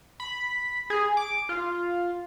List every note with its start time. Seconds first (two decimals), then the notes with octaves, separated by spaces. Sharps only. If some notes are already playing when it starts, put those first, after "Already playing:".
0.20 B5
0.90 G#4
1.17 D6
1.49 F4